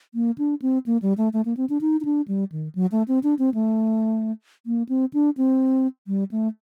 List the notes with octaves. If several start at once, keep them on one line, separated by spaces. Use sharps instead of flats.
A#3
D4
C4
A#3
G3
A3
A3
A#3
C4
D4
D#4
D#4
D4
G3
D#3
F#3
A3
C4
D4
C4
A3
A#3
C4
D4
C4
G3
A3